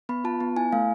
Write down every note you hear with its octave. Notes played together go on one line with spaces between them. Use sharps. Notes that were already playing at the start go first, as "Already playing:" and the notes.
B3 B5
F4 A5
B3
E4 G#5
A3 F5